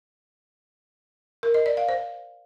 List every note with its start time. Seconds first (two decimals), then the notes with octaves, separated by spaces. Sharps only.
1.43 A#4
1.54 D#5
1.66 D5
1.77 F5
1.89 C5